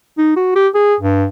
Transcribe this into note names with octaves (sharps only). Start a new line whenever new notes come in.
D#4
F#4
G4
G#4
G2